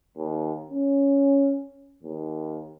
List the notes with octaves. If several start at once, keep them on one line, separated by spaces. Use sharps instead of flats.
D#2
C#4
D#2